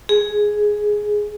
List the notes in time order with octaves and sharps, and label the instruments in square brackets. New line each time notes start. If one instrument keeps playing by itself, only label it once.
[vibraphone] G#4